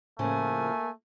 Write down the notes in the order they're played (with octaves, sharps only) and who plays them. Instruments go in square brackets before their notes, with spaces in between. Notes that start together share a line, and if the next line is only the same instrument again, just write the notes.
[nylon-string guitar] A2 C#3 F3 [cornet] A3 [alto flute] A#3 [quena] G#5